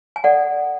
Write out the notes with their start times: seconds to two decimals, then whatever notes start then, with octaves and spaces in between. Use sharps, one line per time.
0.16 G#5
0.24 A4 D5 F#5